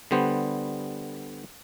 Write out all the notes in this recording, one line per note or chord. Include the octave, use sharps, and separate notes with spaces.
D3 G3 B3 C5